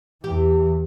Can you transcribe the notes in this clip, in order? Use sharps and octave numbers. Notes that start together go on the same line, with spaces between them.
E2 E3 G4